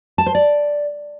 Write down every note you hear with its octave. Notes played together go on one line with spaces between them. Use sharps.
A5
C5
D5